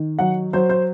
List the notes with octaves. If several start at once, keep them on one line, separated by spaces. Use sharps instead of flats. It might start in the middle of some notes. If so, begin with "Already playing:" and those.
Already playing: D#3
F#3 F#5
F#3 C5
C5